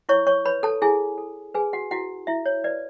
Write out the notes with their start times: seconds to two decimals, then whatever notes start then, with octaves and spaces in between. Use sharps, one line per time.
0.09 E4 C#5 C#6
0.27 C#5 C#6
0.46 B4 C#5 B5
0.63 A4 A5
0.82 E4 G#4 G#5
1.18 A4
1.55 G#4 B4 G#5
1.73 F#4 F#5
1.91 E4 F#4 F#5
2.27 E4 E5
2.46 C#5
2.64 B4 D5